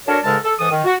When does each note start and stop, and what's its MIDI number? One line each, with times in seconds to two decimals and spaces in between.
0.07 0.17 62
0.07 0.17 66
0.07 0.17 69
0.07 0.17 70
0.07 0.17 73
0.23 0.36 44
0.23 0.36 49
0.23 0.36 56
0.23 0.36 69
0.23 0.36 70
0.23 0.36 81
0.44 0.53 69
0.59 0.68 44
0.59 0.68 52
0.59 0.68 69
0.59 0.68 87
0.71 0.83 51
0.84 0.94 66